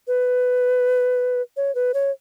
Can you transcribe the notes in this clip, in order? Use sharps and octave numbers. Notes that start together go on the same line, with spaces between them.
B4
C#5
B4
C#5